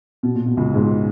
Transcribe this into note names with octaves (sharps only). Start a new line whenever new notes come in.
B2
A#2
B2
C#2 C#3
G#2 G#3